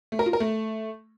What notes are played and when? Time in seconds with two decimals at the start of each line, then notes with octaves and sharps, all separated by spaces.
0.12 A3
0.19 A#4
0.26 F4
0.33 A#4
0.40 A3